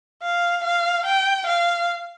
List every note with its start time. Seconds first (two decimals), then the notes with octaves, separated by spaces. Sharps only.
0.23 F5
0.64 F5
1.06 G5
1.47 F5